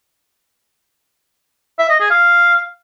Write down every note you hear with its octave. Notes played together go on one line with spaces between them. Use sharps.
E5
D#5
G#4
F5